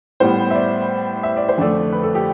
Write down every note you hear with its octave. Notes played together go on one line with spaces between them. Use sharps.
A2 G3 B3 C5
E5
D5
E5
D5
C5
F2 D3 F3 A3 D5
B4
A4
G4